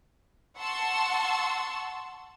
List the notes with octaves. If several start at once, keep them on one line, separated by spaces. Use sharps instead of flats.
F#5 A5 C6 C#6 E6